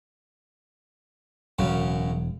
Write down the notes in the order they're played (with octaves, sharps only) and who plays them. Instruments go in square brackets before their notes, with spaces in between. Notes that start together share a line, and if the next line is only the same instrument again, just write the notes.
[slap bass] E1 [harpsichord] F#2 C#3